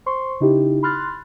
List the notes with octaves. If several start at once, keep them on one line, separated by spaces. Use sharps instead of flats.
C5 C6 C#6
C#3 D#4 E4 G4
B5 C6 F6 F#6 A6